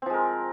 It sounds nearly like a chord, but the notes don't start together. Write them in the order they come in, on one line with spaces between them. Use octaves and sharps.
C4 F3 G#3 A#4